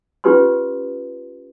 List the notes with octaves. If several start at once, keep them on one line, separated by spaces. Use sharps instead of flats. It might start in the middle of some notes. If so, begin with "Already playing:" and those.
C#4 F4 G4 B4 F#5 C6